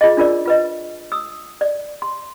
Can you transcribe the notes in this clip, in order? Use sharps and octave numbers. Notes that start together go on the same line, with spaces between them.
F4 G#4 D#5
D4 F4 A#4 D5
F4 B4 D#5
D#6 E6
D5
C6